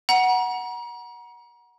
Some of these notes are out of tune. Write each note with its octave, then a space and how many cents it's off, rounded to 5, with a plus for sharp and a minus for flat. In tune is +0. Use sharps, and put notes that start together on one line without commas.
F#5 +0 A#5 +35